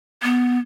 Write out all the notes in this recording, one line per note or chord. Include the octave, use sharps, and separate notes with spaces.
B3